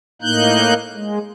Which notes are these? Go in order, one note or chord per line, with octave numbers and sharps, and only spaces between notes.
A2 A#3 D#4 F#6 G6
G#3